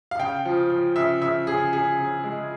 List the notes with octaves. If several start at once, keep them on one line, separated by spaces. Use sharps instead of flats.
F5
C#3 G5
F3
F3
C#3 E5
C#3 E5
C#3 G#4
C#3 G#4
C#3
G#3